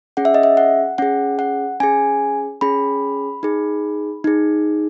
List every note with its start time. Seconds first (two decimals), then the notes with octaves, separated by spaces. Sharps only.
0.17 C#4 G#4 F#5
0.25 E5
0.34 D#5
0.43 E5
0.57 F#5
0.98 C#4 G#4 F#5
1.39 F#5
1.80 C#4 G#4 G#5
2.61 C#4 G#4 B5
3.43 D#4 G#4
4.24 D#4 G#4